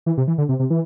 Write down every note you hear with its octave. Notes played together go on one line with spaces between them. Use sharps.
E3
C3
E3
D3
C3
C3
E3